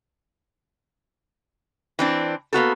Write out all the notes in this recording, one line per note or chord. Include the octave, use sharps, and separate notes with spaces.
E3 C4 D4
A#3 B3 F#4 A4